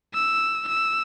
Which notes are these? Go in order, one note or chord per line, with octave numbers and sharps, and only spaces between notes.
E6
E6